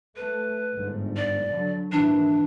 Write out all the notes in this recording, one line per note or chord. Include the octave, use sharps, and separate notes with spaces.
A3 B4
G1 G#2
D5
D3 F#3
G#1 A#2 E3 D4